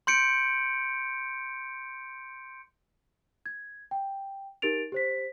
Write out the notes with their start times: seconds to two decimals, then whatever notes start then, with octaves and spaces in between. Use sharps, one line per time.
0.07 C6 G6 C#7 D7
3.46 G#6
3.91 G5
4.62 D#4 G4 A#4 A6 D7 F7
4.92 G4 C5 B6